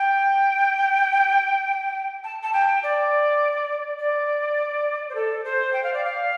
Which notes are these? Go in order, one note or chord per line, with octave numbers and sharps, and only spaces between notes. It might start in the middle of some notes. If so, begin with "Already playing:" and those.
Already playing: G5
A5
A5
G5
D5
D5
C5
A4
C5
G5
F5
D5
F5